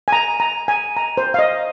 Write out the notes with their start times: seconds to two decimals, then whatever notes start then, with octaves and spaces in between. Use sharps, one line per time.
0.08 G#5
0.12 A#5
0.40 A#5
0.68 G#5
0.97 A#5
1.17 C5
1.34 F5
1.39 D#5